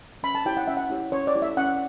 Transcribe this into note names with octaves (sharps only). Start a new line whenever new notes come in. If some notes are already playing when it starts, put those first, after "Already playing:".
C#4 B5
A5
E4 G4 C#5 G5
F#5
C#4 E5
F#5
E4 G4 C#5
C#4 C#5
D5
E4 G4 C#5
E5
C#4 F#5